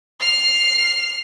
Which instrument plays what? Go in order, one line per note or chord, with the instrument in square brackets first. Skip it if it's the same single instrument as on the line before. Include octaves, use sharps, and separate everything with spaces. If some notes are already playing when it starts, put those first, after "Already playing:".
[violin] F6 C7